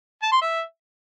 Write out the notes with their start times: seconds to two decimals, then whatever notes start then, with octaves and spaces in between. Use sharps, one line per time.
0.23 A5
0.32 C6
0.41 E5